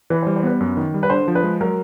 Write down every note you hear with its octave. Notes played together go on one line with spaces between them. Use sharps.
E3 B4
C5
G3
C5
B3 B4
F#2
D#3
G3
B4
D3 C5
F3
B4
G#3
F#3 A#4